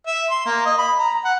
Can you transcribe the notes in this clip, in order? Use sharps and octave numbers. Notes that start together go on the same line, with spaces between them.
E5
C6
A#3
D#5
B5
A#5
F#5